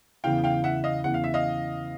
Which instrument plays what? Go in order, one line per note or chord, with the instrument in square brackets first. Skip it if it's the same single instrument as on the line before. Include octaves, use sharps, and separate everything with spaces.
[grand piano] E2 C#3 E3 [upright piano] F5 G5
[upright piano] F5 G5
E5 F#5
D#5 F5
[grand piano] E2 C#3 E3 [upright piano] F#5
[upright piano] F5
E5
D#5 F5